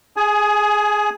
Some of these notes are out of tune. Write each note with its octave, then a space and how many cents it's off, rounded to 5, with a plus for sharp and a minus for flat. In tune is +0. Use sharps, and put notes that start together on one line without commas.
G#4 +0 G#5 +30